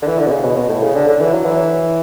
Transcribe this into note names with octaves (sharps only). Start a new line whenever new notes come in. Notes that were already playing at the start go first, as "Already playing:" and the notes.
D3
E3
D3
B2
C#3
B2
B2
A2
C#3
D3
D3
E3
F#3
E3